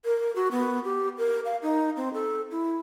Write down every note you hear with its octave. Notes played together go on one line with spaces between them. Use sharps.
A#4
F#4
B3
G4
A#4
F5
D#4
C4
A4
E4